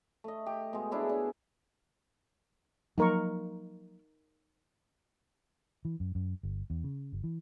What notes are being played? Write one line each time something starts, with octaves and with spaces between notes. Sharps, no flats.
A3 D#5
G4
B2 G#3
D4 E4 G#4 C#5
D4
F3 F#3 A#3 D#4 A#4 C#6
E3
F#2
F#2
G1
E2
C#3
G1
E3